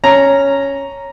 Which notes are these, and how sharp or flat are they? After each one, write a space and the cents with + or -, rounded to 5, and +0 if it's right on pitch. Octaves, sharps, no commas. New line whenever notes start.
C#4 +0 A#5 +0